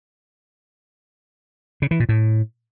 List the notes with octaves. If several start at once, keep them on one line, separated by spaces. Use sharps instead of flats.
C#3
E3
A#2
A2